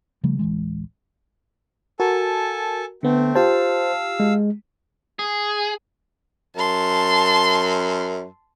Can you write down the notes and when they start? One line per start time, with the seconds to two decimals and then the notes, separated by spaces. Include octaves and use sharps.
0.24 C#3 F3 G3 A3
0.39 D1 A1 E3 G#3
2.00 F#4 A4 A#4 G#5 A5
3.03 D3 A3 B3 C4
3.35 F4 G4 C5 F5 A5 E6
4.20 G#3
5.19 G#4
6.56 F#2 A5 C6